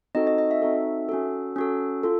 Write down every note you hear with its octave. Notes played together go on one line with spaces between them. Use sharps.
C4 D#4 F#4 A4 D#5
D#5
D#5
E5
C4 D#4 F#4 A4
C#4 F#4 A4
C#4 F#4 A4
F4 A4